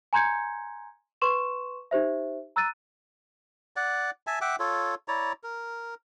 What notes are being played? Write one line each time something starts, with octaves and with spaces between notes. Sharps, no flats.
G#5 A#5 C6 G6 G#6 C#7
B4 C6 C#6 E7
D#4 G4 C5 E5
A#5 E6 F#6 A6 D#7
D5 F#5
E5 G#5 A5
E5 F#5 G5 D6
F4 A4 C#5
E4 C#5 D5 A#5
A#4